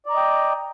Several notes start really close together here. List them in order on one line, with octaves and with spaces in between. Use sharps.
D5 A#5 D#5 G5